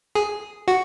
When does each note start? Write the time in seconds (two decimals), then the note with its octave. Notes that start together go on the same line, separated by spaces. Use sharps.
0.15 G#4
0.68 F#4